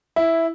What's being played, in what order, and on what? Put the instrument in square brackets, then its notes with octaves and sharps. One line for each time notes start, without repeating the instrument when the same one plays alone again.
[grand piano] E4